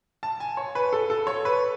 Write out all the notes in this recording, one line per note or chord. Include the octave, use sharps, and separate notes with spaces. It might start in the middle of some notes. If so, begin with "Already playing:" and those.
A5
G#5
C#5
B4
A4
A4
C#5
B4